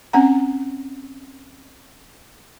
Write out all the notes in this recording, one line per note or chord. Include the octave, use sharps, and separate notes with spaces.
C4 C#4 F#5 A#5